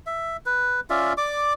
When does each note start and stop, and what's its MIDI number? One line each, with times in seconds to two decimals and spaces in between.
0.06 0.37 76
0.46 0.80 71
0.90 1.13 61
0.90 1.13 65
0.90 1.13 74
0.90 1.13 76
1.17 1.53 74
1.17 1.53 86